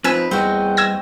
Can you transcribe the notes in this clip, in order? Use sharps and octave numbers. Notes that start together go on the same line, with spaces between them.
F3 C4 D#4 B4 G#5 E6
E2 G3 C4 F#4 D#5
E6 G#6 A#6